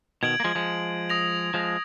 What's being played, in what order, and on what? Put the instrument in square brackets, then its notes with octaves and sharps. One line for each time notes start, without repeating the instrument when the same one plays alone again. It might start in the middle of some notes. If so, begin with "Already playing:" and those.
[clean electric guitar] B2 D#3 [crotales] G#6 D7 F#7
[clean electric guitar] A#3
F3 G#3
F3 G#3
[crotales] D#6 A#6 F7
[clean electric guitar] F3 G#3